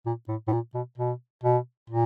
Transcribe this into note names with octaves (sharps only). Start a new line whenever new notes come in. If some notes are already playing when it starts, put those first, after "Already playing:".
A#2
A2
A2
A#2
B2
B2
B2
A#2